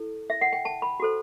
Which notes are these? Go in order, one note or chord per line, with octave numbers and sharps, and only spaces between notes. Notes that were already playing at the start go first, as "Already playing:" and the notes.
Already playing: E4 A4
E5
F#5
G5
A5
B5
F#4 A4 C5